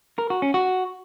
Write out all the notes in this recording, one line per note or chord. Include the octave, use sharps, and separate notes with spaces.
A#4
F#4
C#4
F#4